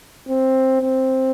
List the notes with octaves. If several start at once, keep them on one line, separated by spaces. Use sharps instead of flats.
C4
C4